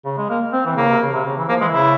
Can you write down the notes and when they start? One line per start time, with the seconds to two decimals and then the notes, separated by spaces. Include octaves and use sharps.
0.05 C#3
0.18 G#3
0.29 A#3
0.53 C4
0.66 E3
0.76 C#3 A#3
0.90 C3
1.01 C#3
1.13 C3
1.26 C#3
1.38 E3
1.49 F3 A#3
1.61 E3 G#3
1.73 C#3 E4